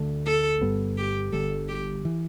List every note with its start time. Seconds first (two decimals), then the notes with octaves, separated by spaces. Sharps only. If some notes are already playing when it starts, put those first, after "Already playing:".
Already playing: D2 D3 A3 D4
0.26 A4
0.61 G1 G2 G3 B3
0.98 G4
1.32 G1 G2 D3 G3 A4
1.68 G4
2.05 E3